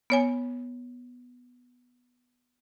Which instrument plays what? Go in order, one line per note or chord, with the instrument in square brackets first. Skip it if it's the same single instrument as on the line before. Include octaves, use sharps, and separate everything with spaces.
[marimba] B3 C#5 G#5